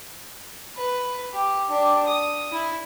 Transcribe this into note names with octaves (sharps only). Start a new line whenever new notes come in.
B4
G4
D4 G4
D#6
E4